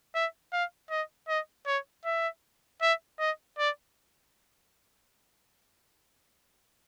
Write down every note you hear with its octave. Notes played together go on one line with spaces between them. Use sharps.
E5
F5
D#5
D#5
C#5
E5
E5
D#5
D5